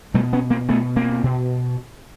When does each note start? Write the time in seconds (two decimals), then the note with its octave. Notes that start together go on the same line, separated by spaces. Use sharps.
0.14 B2 G3 A3
0.33 B3 C#4
0.50 A#3 C4
0.69 B2 A3 B3
0.96 A#3 C4
1.23 B2